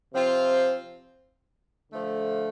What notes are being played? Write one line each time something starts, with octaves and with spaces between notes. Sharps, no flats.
C3 F3 C4 F4
D3 F3 A3